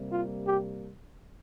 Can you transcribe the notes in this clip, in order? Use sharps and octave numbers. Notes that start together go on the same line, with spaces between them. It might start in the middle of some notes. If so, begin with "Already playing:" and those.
Already playing: C3 G3 A#3
F4
G4